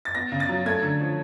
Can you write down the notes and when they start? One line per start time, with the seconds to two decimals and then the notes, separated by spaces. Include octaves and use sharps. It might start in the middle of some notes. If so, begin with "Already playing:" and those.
0.05 A6
0.15 B3 A#6
0.32 C#3
0.40 A6
0.49 F#3
0.66 A3 G#6
0.82 D3
1.00 F3